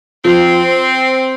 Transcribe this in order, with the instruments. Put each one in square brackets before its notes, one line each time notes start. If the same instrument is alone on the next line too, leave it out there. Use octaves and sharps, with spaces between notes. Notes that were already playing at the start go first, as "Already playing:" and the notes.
[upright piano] F3 [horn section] C4